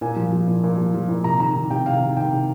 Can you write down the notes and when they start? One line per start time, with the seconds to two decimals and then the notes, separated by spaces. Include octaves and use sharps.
0.01 A#2 G#5
0.16 F3
0.32 F3
0.48 A#2
0.64 A#2
0.78 F3
0.94 F3
1.09 A#2
1.24 C3 A#5
1.40 D#3 A#5
1.56 D#3
1.70 C3 G5
1.86 C3 F5
2.01 D#3
2.17 D#3 G5
2.32 C3